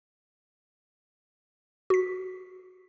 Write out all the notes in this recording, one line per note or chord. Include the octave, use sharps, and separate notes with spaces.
F#4 B6